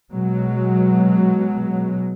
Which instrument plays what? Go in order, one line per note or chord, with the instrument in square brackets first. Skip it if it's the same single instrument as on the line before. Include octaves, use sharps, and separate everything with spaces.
[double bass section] B2 F#3 G#3